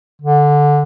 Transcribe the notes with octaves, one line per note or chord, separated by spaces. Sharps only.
D3